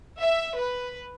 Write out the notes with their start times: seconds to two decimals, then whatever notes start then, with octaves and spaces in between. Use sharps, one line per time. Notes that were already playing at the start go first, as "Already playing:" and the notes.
0.17 E5
0.57 B4